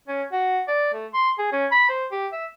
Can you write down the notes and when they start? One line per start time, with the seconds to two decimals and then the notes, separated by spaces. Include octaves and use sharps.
0.08 C#4
0.32 F#4
0.68 D5
0.93 A3
1.14 C6
1.39 G#4
1.52 C#4
1.72 B5
1.89 C5
2.11 G4
2.32 E5